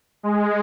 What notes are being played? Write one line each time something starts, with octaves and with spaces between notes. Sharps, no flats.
G#3